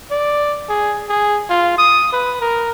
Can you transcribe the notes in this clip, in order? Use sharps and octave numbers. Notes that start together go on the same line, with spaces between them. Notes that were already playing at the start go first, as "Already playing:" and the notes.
D5
G#4
G#4
F4
D#6
B4
A#4